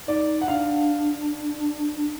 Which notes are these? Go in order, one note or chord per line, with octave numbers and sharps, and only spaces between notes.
D#4 D5
F#5
D4 F5